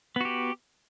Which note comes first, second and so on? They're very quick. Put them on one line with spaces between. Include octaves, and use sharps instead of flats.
B3 F#4 G4